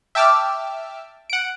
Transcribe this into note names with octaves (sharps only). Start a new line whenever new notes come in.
E5 G5 A5 D6 E6 F6
F#5 D7